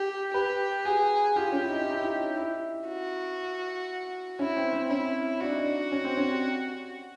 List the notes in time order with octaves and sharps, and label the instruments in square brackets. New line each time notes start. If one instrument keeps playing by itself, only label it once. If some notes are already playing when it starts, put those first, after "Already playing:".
Already playing: [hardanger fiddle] G4
[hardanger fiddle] G4 [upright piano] B4
[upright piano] F#4 [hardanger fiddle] G#4
[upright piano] F4 [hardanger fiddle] G4
[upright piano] C#4
E4
D#4
D#4
E4
D#4
E4
[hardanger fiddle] F#4
[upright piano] C#4 [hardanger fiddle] E4
[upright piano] C4
C4
[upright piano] C#4 [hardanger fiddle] E4
[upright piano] D4 [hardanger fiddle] F#4
[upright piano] D#4
D4
C#4
C4
C#4
G4